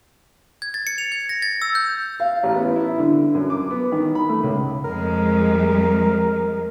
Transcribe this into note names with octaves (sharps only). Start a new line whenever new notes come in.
G#6
A6
C#7
F7
G#6
A#6
A6
E6
G6
F5
A1
B3
E4
D3
F#2
D6
B3
D#3
B5
A3
C#2
F2 G#3 A#4